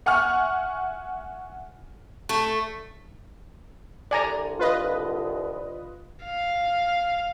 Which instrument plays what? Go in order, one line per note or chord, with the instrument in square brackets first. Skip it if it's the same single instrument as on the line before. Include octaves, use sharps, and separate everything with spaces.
[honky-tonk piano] E5 F#5 G#5 C#6 F6
[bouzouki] A3
[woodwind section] C2 D3 [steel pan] D5 G#5 A#5
[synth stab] F4 B4 D#5
[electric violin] F5